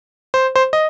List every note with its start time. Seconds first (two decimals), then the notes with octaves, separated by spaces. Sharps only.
0.34 C5
0.56 C5
0.73 D#5